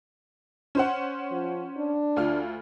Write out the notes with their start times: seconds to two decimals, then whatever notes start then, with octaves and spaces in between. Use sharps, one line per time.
0.75 C#4 C5 F#5
1.31 F3
1.77 D4
2.16 D2 F4 F6